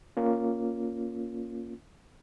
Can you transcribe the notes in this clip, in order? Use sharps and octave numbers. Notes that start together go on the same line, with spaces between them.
A#3 C#4 F4